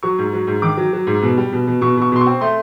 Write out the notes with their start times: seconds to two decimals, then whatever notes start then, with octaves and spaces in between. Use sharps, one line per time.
0.03 F#3 C#6
0.18 G#2
0.33 F#3
0.47 G#2
0.62 D#3 D6
0.77 F#3
0.93 F#3
1.07 G#2
1.23 B2
1.37 G3
1.52 B2
1.67 B2
1.81 B2 C#6
1.97 B2 C#6
2.12 B2 C6
2.21 C#6
2.26 C4
2.41 A3 C6